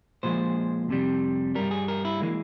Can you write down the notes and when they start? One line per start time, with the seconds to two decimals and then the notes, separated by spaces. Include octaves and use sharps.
0.23 A#2 F3 G#3 C5
0.89 F2 C3 G3
1.55 G2 G3 A#4
1.71 G#4
1.88 A#4
2.05 E4
2.21 E3 G#3 A#3